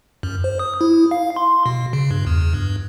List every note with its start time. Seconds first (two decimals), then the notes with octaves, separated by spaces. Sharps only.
0.23 F#2
0.44 C5
0.59 D#6
0.81 E4
1.11 F5
1.36 C6
1.66 B2
1.93 C#3
2.11 G2
2.27 E2
2.54 G2